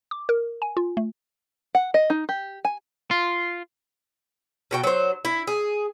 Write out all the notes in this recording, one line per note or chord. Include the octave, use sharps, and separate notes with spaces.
D6
A#4
G#5
F4
A3
F#5
D#5
D#4
G4
G#5
F4
B2 F#4 G5
F#3 C5
E4
G#4